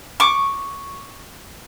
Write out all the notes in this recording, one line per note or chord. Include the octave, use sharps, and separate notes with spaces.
C#6 D6